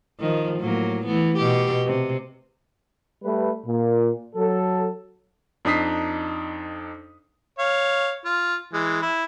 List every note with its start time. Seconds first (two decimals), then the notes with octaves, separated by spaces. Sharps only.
0.20 D#3 F3
0.60 A2 F#3 A#3
1.06 E3 A3 B3
1.38 B2 G4
1.86 C3
3.24 G3 A3 B4
3.66 A#2
4.35 F#3 A4
5.65 F2 D4 D#4 D#6 B6 C7
7.59 C#5 F5
8.25 F4
8.74 E3 G#3
9.02 E4